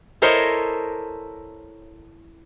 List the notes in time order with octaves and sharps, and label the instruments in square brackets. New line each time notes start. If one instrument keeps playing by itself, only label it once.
[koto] E4 A4 A#4 C5 C#5 D#5